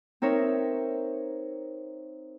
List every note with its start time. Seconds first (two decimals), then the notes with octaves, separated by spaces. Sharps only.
0.22 C4 D#4 A#4 C#5 E5